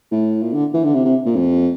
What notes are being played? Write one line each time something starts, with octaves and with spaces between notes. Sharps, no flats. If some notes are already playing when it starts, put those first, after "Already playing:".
A2
A#2
D3
E3
D3
C3
C3
A#2
F2